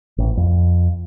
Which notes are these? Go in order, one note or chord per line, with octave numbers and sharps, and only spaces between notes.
A1
F2